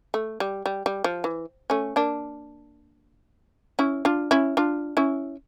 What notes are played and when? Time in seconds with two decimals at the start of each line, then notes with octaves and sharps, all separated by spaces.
0.14 A3
0.40 G3
0.66 G3
0.86 G3
1.04 F3
1.24 E3
1.70 A3 C#4
1.96 A#3 D4
3.79 C#4 E4
4.05 D4 F4
4.31 C#4 E4
4.57 D4 F4
4.97 C#4 E4